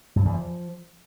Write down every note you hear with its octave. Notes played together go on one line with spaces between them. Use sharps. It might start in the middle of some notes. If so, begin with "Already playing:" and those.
G2
E2
F3